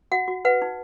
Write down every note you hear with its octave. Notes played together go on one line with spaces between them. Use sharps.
F#4 F#5
F#4
B4 F#5
D#4